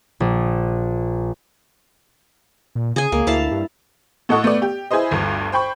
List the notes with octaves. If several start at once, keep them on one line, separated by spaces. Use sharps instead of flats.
A#1
A#2
C#3 G#4 G#5
C#2 A#3
D2 E4 F5 A5
G2
A2 A4 D#5 F#5 C#6
A3 B3 D5
G4
E4 G#4 B4 C5 D#5
G1 D2 G2
C5 G5 B5 C#6